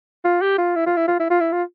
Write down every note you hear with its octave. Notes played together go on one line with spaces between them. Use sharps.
F4
G4
F4
E4
F4
E4
F4
E4
F4
E4
F4